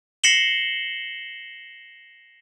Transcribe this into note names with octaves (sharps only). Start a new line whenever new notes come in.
A#6 C7 C#7 E7 F#7 G7